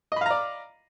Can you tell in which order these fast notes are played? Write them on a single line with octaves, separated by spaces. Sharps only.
D#5 B5 F5 A#5 D5